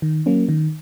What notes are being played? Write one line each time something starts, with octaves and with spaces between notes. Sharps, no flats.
D#3
F#3 A#3 C#4
D#3